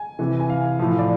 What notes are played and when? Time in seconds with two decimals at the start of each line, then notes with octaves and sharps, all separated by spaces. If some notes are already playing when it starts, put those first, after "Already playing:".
Already playing: G#5
0.19 C3 E3
0.40 G#5
0.50 F5
0.79 A2 F3
0.99 D5